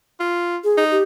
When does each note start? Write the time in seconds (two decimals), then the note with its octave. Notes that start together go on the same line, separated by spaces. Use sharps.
0.20 F4
0.64 G#4
0.77 D#4
0.91 G4